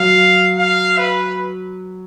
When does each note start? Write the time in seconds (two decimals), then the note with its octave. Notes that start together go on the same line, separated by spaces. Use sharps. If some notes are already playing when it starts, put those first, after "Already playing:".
Already playing: F#3 F5
0.59 F5
0.98 B4